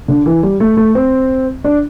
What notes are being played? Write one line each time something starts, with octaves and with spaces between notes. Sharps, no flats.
D3
E3
G3
A3
A3
C4
D4